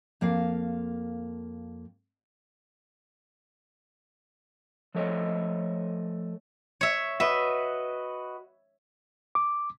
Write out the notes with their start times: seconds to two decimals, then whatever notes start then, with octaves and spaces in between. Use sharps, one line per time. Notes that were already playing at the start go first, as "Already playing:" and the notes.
0.21 F2 A#3 F5
4.95 F3 A3 A4 C#5 D#5
6.81 C#5 E5
7.20 F#4 B4 D#5 E5
9.35 D6